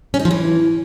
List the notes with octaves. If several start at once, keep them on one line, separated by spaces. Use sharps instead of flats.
C#4
D#4
F3
E3